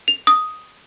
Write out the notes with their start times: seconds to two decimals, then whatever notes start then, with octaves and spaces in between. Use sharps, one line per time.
0.08 F7
0.27 D#6